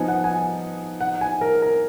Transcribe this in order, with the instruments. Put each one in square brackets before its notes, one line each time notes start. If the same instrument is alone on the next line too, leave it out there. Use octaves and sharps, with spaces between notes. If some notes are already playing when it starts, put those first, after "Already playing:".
Already playing: [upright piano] F3 B3 D#4 [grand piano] G#5
[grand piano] F#5
G#5
F#5
G#5
A#4
A#4